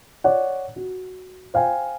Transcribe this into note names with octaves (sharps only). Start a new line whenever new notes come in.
C#5 D5 F#5
F#4
C5 F5 G5 G#5